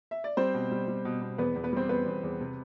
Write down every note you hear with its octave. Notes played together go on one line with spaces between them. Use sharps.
E5
D5
G3 C4 C5
B2
G3
G3
B2
B2
E2 B3 B4
E2
B3 B4
G3 C4 C5
E2 B3 B4
E2
E2
C3